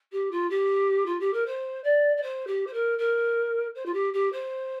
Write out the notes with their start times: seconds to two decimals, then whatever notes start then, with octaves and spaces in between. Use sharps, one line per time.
0.12 G4
0.31 F4
0.50 G4
1.06 F4
1.20 G4
1.33 A#4
1.46 C5
1.84 D5
2.17 D5
2.22 C5
2.47 G4
2.67 C5
2.73 A#4
2.98 A#4
3.75 C5
3.85 F4
3.93 G4
4.13 G4
4.32 C5